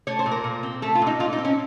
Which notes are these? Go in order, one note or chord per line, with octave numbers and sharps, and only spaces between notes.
A3 C#5
C5
A#2
A#4
A#2
C4
A3 A4
F4
A#2
D#4
A#2 F4
D#4
C4
C#4